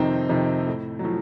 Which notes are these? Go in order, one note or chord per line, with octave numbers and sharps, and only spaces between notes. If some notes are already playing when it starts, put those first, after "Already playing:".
Already playing: F2 C3 D#3 C4 D#4
F2 C3 D#3
A2
F#3
A2 F3